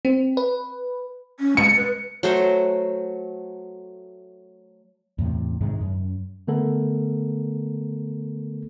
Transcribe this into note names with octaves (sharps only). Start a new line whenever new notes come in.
C4
B4
C#4
G#3 C#7
B4
F#3 A3 C5
E2 A2 C3
G#2 C3 D#3 G#3
F#2
D3 A3 B3 A4 A#4